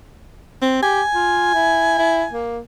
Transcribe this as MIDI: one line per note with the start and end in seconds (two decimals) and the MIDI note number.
0.62 0.78 60
0.82 1.02 67
0.82 2.43 80
1.14 1.53 65
1.54 1.93 64
1.98 2.24 64
2.32 2.59 58